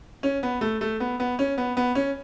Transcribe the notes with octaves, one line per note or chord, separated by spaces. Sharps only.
C#4
B3
A3
A3
B3
B3
C#4
B3
B3
C#4